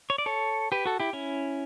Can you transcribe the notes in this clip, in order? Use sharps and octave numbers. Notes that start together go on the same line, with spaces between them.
C#5
D5
A4 C#5
G4 B4
F#4 A4
E4 G4
C#4 E4